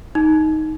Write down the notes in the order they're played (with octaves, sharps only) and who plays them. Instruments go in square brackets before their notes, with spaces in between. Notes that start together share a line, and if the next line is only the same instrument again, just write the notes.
[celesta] D#4